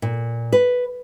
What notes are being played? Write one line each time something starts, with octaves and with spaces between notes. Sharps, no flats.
A#2
B4